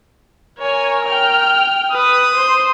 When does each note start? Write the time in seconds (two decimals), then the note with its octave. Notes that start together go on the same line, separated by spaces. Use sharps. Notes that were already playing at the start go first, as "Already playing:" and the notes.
0.59 A#4 C#5 G#5
1.05 G5 F6
1.92 B4 D#6
2.35 C5